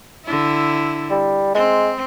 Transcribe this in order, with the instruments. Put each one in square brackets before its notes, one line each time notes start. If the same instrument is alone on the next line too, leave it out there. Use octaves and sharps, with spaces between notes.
[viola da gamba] D3 E4
[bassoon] G3
[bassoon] G#3 [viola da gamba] C4